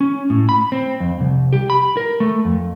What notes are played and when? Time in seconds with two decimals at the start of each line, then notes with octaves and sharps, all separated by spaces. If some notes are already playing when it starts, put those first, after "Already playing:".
0.01 C#4
0.30 A2
0.49 B5
0.72 C4
1.00 F2
1.20 C2
1.53 G4
1.70 B5
1.97 A#4
2.20 A3
2.45 F2